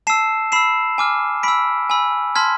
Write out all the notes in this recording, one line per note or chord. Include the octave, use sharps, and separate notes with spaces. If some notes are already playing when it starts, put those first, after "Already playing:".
A5 E6 C7 E7
B5 E6 C7 E7
G#5 D6 F6
B5 E6 B6 D7
G#5 B5 E6
A5 C6 F6 G#6 B6